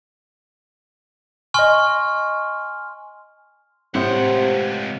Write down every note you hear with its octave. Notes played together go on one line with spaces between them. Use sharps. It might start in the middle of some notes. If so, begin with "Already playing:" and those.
D#5 G#5 C6 C#6 F6
C#2 A2 C3 C4 C5 F#5 G5